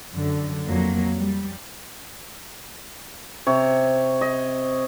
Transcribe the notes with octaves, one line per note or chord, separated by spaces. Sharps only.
F#2 D3
F2 F#3 A#3
G3
C3 C#5
D#5